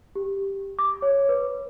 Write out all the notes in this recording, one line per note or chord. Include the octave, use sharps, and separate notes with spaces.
G4
D6
C#5
B4